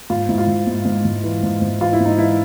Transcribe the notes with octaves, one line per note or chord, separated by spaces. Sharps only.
G#2 F4
G#2 E4
F4
G#2
G#2
G#2
G#2
E3
G#2
G#2
E3 F4
E4
G#2 D#4
E3 E4